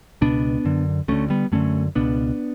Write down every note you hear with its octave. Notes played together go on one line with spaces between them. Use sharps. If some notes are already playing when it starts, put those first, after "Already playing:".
C#2 B2 B3 D4
F#2 D3
D2 D3 A3 C#4
G3 B3
F#2 D3 A3 C#4
C#2 B2 B3 D4